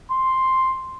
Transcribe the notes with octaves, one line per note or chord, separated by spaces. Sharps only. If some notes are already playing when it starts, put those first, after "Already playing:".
C6